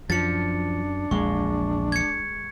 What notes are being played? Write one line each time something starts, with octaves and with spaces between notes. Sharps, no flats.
F#2 F3 D4 A6 C#7
A#1 E2 G#3 C#6
G#6 C#7